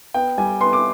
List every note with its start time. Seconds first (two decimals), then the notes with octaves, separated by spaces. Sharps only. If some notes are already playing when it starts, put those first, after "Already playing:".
0.14 B3 G5
0.38 G3 G#5
0.61 B3 C6
0.73 D6